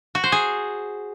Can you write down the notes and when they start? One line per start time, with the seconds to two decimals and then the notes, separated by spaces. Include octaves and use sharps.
0.15 F#4
0.24 C5
0.32 G#4